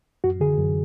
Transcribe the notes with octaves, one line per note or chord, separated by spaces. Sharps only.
F#2 F#4
D3 G#4
F#2